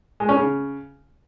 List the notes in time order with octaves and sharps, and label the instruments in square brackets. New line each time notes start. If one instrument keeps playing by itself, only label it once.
[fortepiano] G#3
C#4
C#3